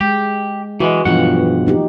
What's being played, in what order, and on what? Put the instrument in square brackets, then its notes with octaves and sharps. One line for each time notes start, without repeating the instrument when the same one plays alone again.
[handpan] G#3 [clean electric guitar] G4
[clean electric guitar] E3 F#3 G#3 [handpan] F#4
[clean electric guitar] B1 G2 F#5 [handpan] E3 F3 F4
[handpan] A#3 D#4 G4